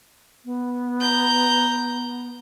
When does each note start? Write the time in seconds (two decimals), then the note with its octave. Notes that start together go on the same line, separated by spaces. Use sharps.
0.45 B3
1.01 A#5 G6